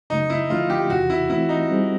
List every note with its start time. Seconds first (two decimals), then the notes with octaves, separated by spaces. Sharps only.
0.10 F#2 C#3 F#3 A3 D#4
0.30 E4
0.50 D3 F3 A3 D4 F4
0.70 G4
0.89 E2 C3 E3 F#4
1.10 E4
1.30 E3 A3 C4 E4
1.49 D#4
1.70 G3 C4 D#4 G#4